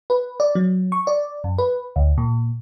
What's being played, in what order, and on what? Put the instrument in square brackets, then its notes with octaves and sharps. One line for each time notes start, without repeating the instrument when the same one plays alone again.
[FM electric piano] B4
D5
F#3
C#6
D5
F#2
B4
D2
A#2